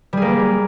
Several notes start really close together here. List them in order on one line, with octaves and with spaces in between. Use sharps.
G3 G#4 A#3